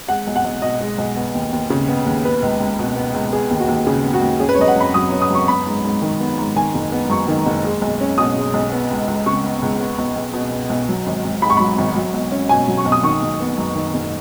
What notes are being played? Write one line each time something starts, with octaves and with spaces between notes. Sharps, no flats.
G#3 F#5
B1
F#5
B1
B2 D#5
G#3
B1
B3
D#2
D#2
C#3
B3
D#2
B3 B4
C#2
C#2
B2
B3
C#2
B3 G#4
D#2
F#4
D#2
C#3 G#4
B3
F#4
D#2
C#4 G#4
B4
C#5
F#2 D#5
F#5
F#2 B5
F#3 D#6
C#4
D#6
F#2 C#6
B3 B5
G#2
G#2
D#3
B3
G#2
D#3 G#5
F#1
B3
F#2 C#6
D#3
F#1
G#3
B1
C#4
B2 D#6
G#3
B1
B3
C#2
C#2
C#3 C#6
B3
C#2
B3
B1
B1
B2
B3
B1
F#3
G#1
G#1
G#2 B5
C#6
F#3 B5
G#1
F#3
B1
C#4
B2 G#5
F#3
C#6
B1
D#6
D#3 C#6
F#1
B3
F#2
D#3
F#1